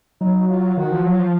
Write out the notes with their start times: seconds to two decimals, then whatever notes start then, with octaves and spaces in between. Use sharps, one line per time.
0.21 F#3 D#4
0.49 F4
0.77 D#3 F#4
0.92 F3
1.06 F#3 F4
1.20 F3